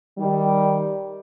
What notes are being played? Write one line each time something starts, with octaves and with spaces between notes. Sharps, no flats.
D#3 G3